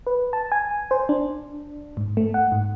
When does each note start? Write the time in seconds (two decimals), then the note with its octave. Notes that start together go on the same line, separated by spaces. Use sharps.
0.07 B4
0.33 A5
0.52 G#5
0.91 C5
1.09 D4
1.97 G#2
2.17 A3
2.34 F#5
2.52 G#2